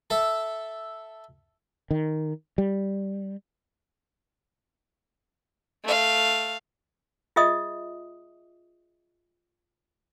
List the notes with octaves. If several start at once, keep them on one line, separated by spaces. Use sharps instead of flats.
A4 E5
D#3
G3
A3 F5
F4 G#4 D#5 E5 D#6